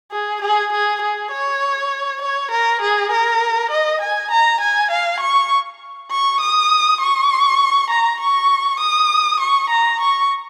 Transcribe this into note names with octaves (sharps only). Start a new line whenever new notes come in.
G#4
G#4
G#4
G#4
C#5
C#5
A#4
G#4
A#4
D#5
G#5
A#5
G#5
F5
C#6
C#6
D#6
C#6
A#5
C#6
D#6
C#6
A#5
C#6